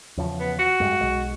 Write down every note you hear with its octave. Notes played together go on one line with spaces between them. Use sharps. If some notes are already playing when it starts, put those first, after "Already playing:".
E2 C#3 F3
B3
F#4
G2 G#3
B1 G#3